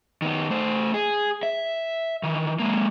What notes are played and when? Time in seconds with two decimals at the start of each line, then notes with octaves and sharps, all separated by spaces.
0.22 D#3 B3
0.51 A3 C5
0.94 G#4
1.43 E5
2.23 D#3 E3
2.59 G#3 A#3